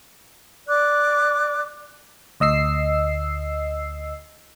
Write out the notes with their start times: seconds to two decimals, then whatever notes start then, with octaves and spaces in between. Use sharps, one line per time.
0.67 D5 D6 F#6
2.40 D2 D#5 E6 C7